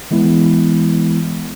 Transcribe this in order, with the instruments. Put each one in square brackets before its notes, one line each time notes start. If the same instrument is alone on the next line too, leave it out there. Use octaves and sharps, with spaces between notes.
[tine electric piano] E3 G#3 B3 E4